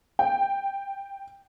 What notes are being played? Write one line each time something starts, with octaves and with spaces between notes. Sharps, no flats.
G5